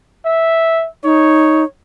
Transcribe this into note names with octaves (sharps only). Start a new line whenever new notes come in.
E5
D#4 C#5